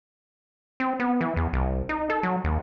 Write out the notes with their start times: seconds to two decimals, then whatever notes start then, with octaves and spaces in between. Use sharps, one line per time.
0.80 C4
1.00 B3
1.21 E3
1.36 E2
1.53 C2
1.89 D#4
2.10 A4
2.23 F#3
2.44 D#2